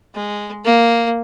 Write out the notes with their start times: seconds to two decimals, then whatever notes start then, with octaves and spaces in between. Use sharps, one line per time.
0.15 G#3
0.65 A#3